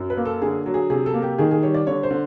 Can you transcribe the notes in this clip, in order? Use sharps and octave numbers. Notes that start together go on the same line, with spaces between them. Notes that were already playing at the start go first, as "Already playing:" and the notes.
Already playing: F#2
B4
A#3
A4
D3 G#4
F#3
G#4
C3 G#4
A4
A#3
G4
D#3 G#4
G#4
G3 C#5
D5
D3 C#5
C5
D3